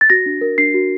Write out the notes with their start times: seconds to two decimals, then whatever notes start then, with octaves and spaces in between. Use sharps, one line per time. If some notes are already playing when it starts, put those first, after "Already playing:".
0.01 A6
0.10 F#4 A#6
0.26 D4
0.41 A#4
0.58 D4 C7
0.74 F#4